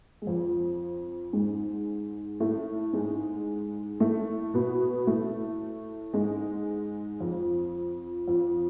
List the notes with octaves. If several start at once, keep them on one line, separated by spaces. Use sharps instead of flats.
G#3
F2 F3
G#2 G#3
A2 A3
G#2 G#3
A2 A3
B2 B3
A2 A3
G#2 G#3
F2 F3
F2 F3